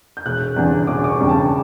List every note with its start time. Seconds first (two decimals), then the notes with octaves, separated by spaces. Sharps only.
0.17 G6
0.26 E1 F#6
0.56 E2 C#3 G3 D4
0.87 E1 D6
1.04 D6
1.09 C#6
1.20 E2 C#3 G3 D4 G5
1.29 A5